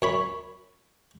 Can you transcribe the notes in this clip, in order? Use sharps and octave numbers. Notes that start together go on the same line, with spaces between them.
F#2 C#5 B5